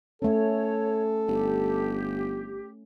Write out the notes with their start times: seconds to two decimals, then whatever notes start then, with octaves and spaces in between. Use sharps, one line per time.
0.22 A3 C#4 A4 C#5
1.28 G1 G4